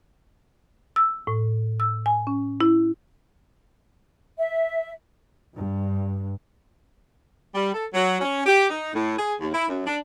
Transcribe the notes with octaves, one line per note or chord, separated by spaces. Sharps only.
E6
A2
E6
G#5
C#4
E4
E5
G2
G3
A4
F#3
C#4
G4
D#4
A2
G#4
D#2
E4
F#2
D4